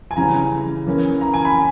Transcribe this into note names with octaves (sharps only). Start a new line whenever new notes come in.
G#5
C#3 E3 G3 C#4 A#5
E3 A#3 C#4
A#5
G#5
B5